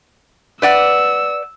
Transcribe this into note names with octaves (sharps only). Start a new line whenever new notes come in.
B4 D5 F#5 E6